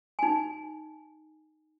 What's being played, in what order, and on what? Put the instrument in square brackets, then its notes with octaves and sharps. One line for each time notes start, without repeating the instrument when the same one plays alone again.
[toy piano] D#4 G#5